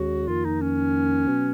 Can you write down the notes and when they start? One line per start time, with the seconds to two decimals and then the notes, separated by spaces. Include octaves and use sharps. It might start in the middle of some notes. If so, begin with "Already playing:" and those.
Already playing: D#2 G#3 C#4 F#4
0.28 F2 D#3 A#3 F4
0.45 D#4
0.61 C#4
1.27 B2 F#3 B3